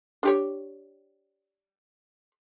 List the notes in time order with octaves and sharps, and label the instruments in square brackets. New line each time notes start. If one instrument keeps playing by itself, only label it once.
[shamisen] D4 G4 C#5